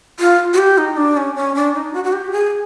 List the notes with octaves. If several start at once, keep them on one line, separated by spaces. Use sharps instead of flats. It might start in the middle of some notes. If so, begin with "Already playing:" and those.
F4
F#4
G4
D#4
D4
C#4
C#4
D4
D#4
F#4
F#4
G4
G#4